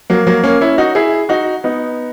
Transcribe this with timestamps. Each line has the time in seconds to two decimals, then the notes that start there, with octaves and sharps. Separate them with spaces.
0.10 F#3 A#3
0.27 F#3 A#3
0.44 A#3 C#4
0.61 C#4 E4
0.78 D#4 F#4
0.95 E4 G#4
1.29 D#4 F#4
1.64 B3 D#4